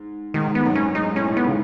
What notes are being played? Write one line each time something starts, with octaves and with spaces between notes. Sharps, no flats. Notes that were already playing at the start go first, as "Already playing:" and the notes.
Already playing: G#2
G#2 D#3
B3
G#2
F#2
C#4
G#2 D#4
A2 C#4
A2
G#2 B3
C#3